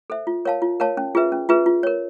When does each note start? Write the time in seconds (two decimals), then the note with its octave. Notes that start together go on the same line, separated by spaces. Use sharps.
0.10 A4 C5 E5
0.27 F4
0.45 A#4 C#5 F5 A5
0.62 F4
0.80 A#4 C#5 F5 A5
0.97 C#4
1.15 F4 G#4 B4 E5
1.32 C#4
1.49 F4 G#4 B4 E5
1.66 F4
1.83 A#4 C#5